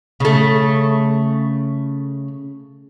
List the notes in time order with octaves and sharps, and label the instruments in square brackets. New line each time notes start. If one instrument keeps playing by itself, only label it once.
[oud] C#3 A3